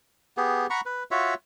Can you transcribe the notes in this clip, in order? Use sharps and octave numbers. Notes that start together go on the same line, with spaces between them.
B3 G4 G#4
F#5 A#5 B5 C#6
B4
F4 F#4 C#5 E5